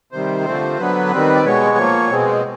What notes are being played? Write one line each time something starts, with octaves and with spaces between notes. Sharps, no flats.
C3 D#3 G3 C5
D3 F3 A3 C4
D3 F#3 B3 B4
D#3 G3 C4
D5
B2 G#3 B3 C#5
A#2 F3 A#3
B2 G#3 C4